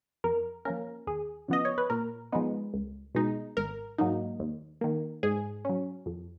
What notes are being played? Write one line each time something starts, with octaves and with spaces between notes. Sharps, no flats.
F2 A#4
F3 A#3 C#4 A#4
D#2 G#4
C#3 F3 B3 D#5
C#5
B4
A#2 A#4
F3 G#3 B3 D#4
C#2
B2 G#3 D#4
G#1 A#4
G#2 F#3 A#3 D#4
D#2
D#3 A#3
G#2 G#4
F#3 C#4
F2